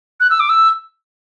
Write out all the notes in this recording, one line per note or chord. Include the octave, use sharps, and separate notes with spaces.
F#6
E6
D6
E6